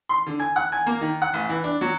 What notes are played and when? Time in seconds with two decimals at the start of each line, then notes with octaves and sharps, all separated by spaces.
0.09 C6
0.26 D3
0.39 G#5
0.56 F#5
0.72 G#5
0.86 A#3
1.01 D#3
1.22 F#5
1.33 A1
1.49 E3
1.64 D4
1.81 F#3